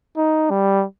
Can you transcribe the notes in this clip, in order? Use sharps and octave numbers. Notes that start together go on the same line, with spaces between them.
D#4
G3